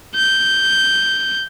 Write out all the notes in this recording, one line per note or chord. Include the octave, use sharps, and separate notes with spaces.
G6